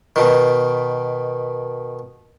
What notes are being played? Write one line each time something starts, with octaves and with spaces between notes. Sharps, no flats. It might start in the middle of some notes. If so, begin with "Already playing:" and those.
B2 D#3